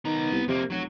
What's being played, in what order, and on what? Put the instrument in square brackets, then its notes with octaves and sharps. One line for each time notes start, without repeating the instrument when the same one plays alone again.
[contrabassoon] D#3 [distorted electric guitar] B3 A#5
[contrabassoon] C2
[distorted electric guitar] F2 A#3 [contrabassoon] C3
[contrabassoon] F1 [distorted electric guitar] F#3 F#4